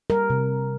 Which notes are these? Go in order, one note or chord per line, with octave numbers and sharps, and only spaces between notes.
G3 A#4
C3